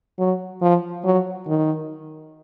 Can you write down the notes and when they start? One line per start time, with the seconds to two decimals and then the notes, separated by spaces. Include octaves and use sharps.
0.19 F#3
0.61 F3
1.05 F#3
1.48 D#3